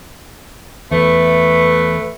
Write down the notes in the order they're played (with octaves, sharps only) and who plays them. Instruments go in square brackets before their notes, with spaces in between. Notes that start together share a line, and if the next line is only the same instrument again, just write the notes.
[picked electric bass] E2 [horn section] A3 B4